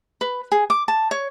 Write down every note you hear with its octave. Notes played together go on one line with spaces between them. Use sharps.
B4
G#4
D6
A5
C#5